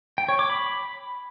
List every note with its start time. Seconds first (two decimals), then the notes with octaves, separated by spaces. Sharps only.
0.18 G5
0.29 C#5
0.39 D6
0.50 B5